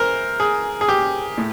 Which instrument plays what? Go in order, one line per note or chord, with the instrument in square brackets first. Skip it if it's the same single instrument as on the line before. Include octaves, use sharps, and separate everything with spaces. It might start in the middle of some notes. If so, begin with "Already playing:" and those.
Already playing: [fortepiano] E3 A#4 C5
G#4
G#4
G4
A2